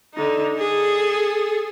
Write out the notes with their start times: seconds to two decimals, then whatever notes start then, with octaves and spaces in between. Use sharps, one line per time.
0.14 D3 D#4
0.59 G#4 A4